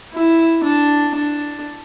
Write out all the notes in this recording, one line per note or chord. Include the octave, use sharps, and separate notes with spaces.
E4
D4
D4